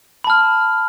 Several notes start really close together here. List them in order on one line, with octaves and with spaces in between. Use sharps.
B5 A5 F6